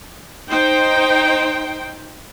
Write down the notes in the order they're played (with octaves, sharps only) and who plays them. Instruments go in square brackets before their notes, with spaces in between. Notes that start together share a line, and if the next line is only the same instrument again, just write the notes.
[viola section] D#4 C5 G5